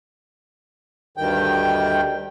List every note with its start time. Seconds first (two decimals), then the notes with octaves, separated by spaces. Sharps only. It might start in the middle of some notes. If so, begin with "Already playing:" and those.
1.17 D2 G2 D#3 G5